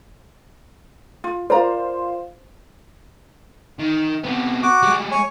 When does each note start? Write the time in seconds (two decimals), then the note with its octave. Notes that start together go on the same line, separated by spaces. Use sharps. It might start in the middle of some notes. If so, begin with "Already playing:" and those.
1.24 F4
1.50 F4 A#4 C5 D5 A#5
3.79 D#3
4.24 C3 B3
4.63 F#4 D6
4.83 G3 G#3
5.11 C#5 G#5